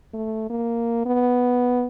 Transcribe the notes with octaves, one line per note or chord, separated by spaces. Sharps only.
A3
A#3
B3